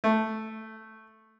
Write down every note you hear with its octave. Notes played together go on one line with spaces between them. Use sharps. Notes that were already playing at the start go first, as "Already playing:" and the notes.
A3